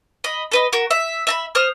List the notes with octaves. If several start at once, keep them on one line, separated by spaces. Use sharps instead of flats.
D#5 B5
A4 B4 D#5
F#4 A#4
E5
E5 A#5 B5
C5 D#6 F6